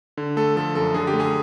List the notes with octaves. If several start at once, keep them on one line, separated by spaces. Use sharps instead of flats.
D3
A3 A4
F3 A4
F#2 A4
D3 G#4
G4
A3
G#4